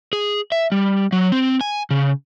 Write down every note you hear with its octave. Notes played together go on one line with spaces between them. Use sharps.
G#4
E5
G3
F#3
C4
G#5
C#3